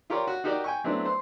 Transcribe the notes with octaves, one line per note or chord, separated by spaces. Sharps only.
F4 G4 A#4 C#5 D5
F#4
D#4 F#4 G4 A#4 D5
G5 G#5 C#6
F#3 A3 B3 C4 D4 E4
C5